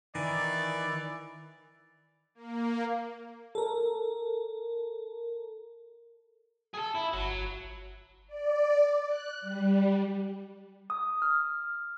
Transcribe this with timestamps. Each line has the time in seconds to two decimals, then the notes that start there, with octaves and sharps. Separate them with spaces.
0.15 D#3 E3 D5
2.35 A#3
3.55 A4 A#4
6.75 G#4 A4
6.95 E4
7.13 G1 F#3
8.27 D5
9.07 F#6
9.41 G3
10.90 D#6
11.22 F6